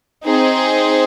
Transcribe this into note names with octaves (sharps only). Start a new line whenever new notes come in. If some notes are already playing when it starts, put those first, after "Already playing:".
C4 D#4 G#4 C5